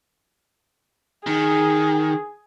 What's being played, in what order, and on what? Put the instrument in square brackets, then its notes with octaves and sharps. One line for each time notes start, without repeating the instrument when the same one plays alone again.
[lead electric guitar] D#3 [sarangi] G#4